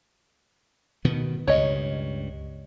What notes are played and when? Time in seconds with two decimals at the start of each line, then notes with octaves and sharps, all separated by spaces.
1.05 B2 D#3 B3
1.47 C#2 G2 C#5 D#5